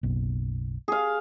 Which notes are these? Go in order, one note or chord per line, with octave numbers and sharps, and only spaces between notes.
F#1 B1
G#4 F5